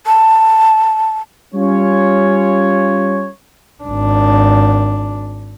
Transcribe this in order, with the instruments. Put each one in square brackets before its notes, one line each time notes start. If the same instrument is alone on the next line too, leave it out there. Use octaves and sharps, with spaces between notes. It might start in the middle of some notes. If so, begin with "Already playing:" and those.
[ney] A5
[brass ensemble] G3 C#4 F4 C#5
[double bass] G#1 D4